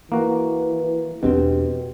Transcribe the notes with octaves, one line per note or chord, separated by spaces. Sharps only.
E3 A#3 F#4
E2 B2 C4 D4 G4